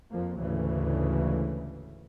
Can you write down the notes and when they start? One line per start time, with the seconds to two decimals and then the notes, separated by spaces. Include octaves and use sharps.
0.11 F2 F3 A#3
0.39 D2 G#2 C#3 E3